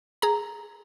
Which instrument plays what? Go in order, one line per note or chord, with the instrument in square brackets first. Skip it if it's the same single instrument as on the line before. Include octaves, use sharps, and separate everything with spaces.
[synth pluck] G#4 A#5